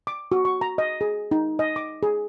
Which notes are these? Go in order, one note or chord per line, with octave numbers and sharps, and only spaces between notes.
D6
F#4
C#6
A#5
D#5
G#4
D#4
D#5
D6
G#4